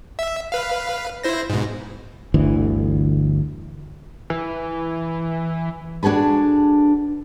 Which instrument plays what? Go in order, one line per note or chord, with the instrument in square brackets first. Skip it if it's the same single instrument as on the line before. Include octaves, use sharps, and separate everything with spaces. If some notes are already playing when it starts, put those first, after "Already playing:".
[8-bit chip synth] E5
B4 F5
E4 C5 A#6
G#2 B2
[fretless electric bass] G1 D2 E3
[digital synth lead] E3
[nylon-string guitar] D4 F#4 G#4 A4 B4